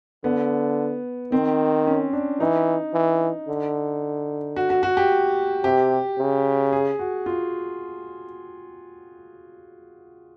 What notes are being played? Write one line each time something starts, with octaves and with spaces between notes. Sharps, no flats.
D3 B3
D#3 C4
C#4
D4
E3 D#4
E3
D3
F#4
F#4
F#4
G4
C3 G4
C#3
G#4
F#4
F4